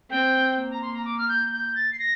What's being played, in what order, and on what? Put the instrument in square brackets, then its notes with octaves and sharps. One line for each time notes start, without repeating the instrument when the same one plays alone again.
[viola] C4 [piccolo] G5
[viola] A#3
[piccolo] A#5
C6
A#5
D6
F6
G6
G6
A6
C7
A#6